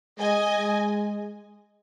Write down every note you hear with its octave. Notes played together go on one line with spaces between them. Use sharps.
G#3 D#5 G#5
G#3